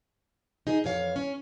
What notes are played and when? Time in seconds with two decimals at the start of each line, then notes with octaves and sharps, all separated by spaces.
0.67 D#4 G#4
0.84 F2 E3 C#5 F5
1.16 C#4